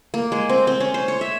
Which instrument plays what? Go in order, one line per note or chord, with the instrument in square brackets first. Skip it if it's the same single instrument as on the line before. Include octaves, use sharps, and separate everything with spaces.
[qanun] A#3
G#3
C4
C4
C#4
C5
C#5
E5